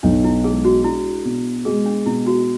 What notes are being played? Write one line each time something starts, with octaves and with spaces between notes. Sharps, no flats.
B1 D4
E4
G#3 G#4
F#4
D4 E4
B2
G#3 G#4
D4
B2 E4
F#4